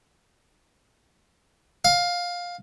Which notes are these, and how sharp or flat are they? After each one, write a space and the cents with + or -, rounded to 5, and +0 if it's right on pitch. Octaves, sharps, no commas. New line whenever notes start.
F5 +15